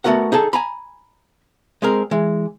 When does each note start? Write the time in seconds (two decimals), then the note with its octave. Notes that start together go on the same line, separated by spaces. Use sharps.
0.04 A3 B3 F#4 A#4 F#5
0.32 D#4 G#4 A4 A5
0.53 G#5 A#5 B5
1.82 G#3 C4 G#4 A#4
2.11 E3 G#3